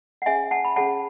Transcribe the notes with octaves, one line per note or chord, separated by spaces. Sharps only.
F#5
C#4 G#4 C#5 E5 G#5
F#5 A5
B5
C#4 G#4 C#5 F#5 A5